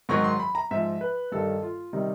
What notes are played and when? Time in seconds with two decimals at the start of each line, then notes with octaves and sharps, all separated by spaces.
0.09 G#2 D#3 F#3 C#6
0.24 C6
0.40 B5
0.55 A#5
0.71 G#2 F3 E5
1.01 B4
1.32 G2 D#3 G3 A4
1.63 F4
1.93 C3 D#3 G3 D#4